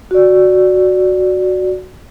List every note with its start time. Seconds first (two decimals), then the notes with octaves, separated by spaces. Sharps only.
0.11 F#4 D5